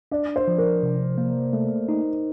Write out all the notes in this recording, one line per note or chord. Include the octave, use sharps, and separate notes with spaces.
D4 D5
C5
F3
A#4
C3
A#3
A3
D#4